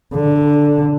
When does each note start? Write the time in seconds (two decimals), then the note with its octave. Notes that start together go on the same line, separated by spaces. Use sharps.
0.14 D3